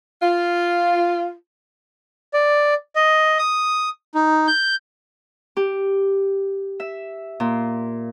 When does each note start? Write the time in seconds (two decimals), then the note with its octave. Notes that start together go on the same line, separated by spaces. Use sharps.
0.21 F4
2.34 D5
2.96 D#5
3.39 D#6
4.15 D#4
4.47 G6
5.57 G4
6.80 E5
7.40 A#2